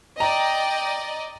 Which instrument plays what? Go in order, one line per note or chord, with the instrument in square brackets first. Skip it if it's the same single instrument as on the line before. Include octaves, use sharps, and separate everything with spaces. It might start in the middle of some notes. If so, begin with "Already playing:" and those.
[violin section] D5 D#5 [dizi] G5 [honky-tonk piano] A#5